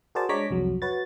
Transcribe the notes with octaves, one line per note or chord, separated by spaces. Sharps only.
F#4 G#4 A#4 C5 D5 A5
G#3 D4 C#5 A#5 D6 B6
C2 F2 F#3
F#4 B4 C#5 A6